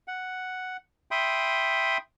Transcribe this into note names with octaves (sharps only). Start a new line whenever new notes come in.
F#5
E5 G5 B5 C6 D#6